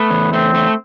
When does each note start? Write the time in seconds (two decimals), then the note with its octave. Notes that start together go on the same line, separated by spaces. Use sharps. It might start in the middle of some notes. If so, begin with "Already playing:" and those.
Already playing: A3 B3
0.10 E2
0.32 A3 C4
0.55 A3